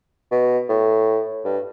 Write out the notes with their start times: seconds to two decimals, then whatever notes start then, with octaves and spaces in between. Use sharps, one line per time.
0.31 B2
0.69 A2
1.45 G2